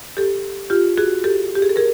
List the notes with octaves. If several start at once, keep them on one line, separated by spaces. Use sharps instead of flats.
G4 A4
F4 G4
F#4 G#4
G4 A4
G4
G#4
A4
G#4 A#4